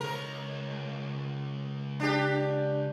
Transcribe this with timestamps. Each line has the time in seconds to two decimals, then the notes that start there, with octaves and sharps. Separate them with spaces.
0.01 C#2 A#4 C#5
2.00 D4 G4